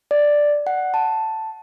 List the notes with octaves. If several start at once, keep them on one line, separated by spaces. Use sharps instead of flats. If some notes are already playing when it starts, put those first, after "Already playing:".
D5
F#5
A5